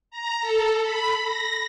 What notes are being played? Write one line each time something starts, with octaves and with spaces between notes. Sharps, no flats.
A#5
A4
B5
A#6